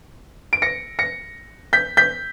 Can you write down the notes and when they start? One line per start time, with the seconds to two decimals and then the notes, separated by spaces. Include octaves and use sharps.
0.53 D7
0.62 A#6 C#7
0.99 A#6 C#7
1.73 G6 B6
1.97 G6 B6